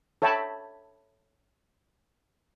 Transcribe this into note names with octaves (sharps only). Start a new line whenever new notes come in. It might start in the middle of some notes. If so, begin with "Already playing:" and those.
A4 C#5 E5 G5 A5 B5